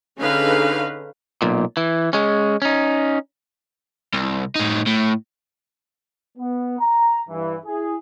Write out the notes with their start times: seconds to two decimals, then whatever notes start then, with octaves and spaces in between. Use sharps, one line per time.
0.20 D3 C#4 D#4 G#4 B4 F5
1.42 B1 A#2
1.77 E3
2.13 G#3 C#4
2.62 C#4 D#4
4.13 C2
4.55 A2 D#4
4.86 A2
6.38 B3
6.79 A#5
7.29 G2 E3
7.66 E4 G#4